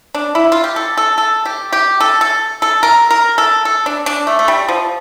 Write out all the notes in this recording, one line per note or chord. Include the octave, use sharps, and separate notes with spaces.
D4
E4
F4
G4
A4
A4
A4
G4
G4
A4
A4
A4
A#4
A#4
A4
A4
D4
D4
A3
A3
G3
F3